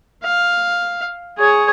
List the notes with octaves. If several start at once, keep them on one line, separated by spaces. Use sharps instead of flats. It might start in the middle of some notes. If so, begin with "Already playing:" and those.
F5
G#4 C#5